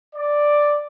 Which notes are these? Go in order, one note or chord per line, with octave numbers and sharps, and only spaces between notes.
D5